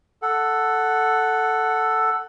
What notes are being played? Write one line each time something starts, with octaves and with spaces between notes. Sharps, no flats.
A4 F#5